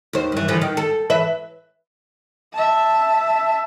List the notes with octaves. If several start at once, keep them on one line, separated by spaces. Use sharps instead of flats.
D#2 C5
G2 E3
D3 E3 F3
D#3
A4
E3 B4 E5
E5 A5